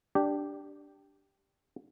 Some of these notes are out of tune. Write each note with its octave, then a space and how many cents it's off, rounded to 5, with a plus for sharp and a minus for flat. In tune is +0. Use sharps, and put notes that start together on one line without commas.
D4 +0 G4 +0